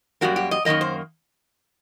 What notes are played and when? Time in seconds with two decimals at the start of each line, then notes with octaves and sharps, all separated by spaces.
0.21 F#2 D#3 G3 A#3 F#4
0.36 G4
0.51 D#5
0.65 F#2 D#3 G3 A#3 D#5
0.81 C5